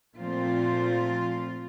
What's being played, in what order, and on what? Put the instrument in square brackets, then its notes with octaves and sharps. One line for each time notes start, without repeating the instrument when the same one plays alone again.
[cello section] A#2 F3 A3 C4 F4